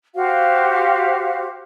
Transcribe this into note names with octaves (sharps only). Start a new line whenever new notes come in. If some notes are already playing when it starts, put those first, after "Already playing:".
F#4 G4 C5 F5